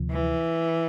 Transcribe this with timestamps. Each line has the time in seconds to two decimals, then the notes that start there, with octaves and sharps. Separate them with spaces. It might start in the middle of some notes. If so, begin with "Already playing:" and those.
Already playing: D2 C3 F3
0.11 E3